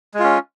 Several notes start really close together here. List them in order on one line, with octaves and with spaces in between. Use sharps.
G#3 F4 C#4